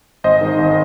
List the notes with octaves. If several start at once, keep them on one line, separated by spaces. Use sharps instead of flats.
G#1 C5 D#5
G#2 D#3
G#1